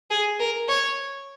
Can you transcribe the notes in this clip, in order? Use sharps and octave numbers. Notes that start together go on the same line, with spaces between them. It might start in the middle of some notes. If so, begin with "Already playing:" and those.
G#4
A#4
C#5